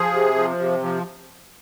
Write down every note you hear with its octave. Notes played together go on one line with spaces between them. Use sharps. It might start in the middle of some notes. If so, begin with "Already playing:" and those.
Already playing: F3 G#4
C3
F3
C3
F3